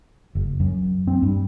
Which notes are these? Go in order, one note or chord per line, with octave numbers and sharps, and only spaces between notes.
F#1
F#2
C4
G2